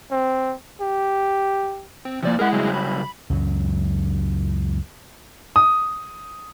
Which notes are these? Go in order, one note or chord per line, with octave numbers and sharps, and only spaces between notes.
C4
G4
C4
C3 F3 A#3 D5
G#3 E4 G#4 A#4 F#5
C#3 F#3 G3
B5
C#2 F#2 F#3
D#6